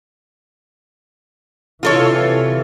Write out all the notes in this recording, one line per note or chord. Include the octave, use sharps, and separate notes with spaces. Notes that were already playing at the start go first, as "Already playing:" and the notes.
C3 E3 F4 A4 C#5